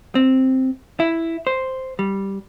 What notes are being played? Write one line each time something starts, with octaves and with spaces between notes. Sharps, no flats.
C4
E4
C5
G3